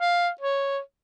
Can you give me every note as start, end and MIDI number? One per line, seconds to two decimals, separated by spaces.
0.01 0.29 77
0.41 0.79 73